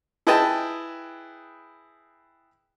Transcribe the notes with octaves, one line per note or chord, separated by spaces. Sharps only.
E4 G#4 B4 D#5 G5 A5